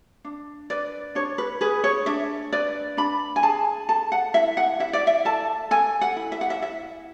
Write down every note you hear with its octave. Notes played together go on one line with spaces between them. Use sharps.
D4
B4 D5
D4 C#5
B4
G#4 B4
C#5
D4 E5
B4 D5
D4 B5
G#5
G#4 A5
A4 A5
F#5
E4 E5
F#5
E4 E5
D5
E5
A4 A5
A4 G#5
F#5
E4
E5
F#5
E5
E4 E5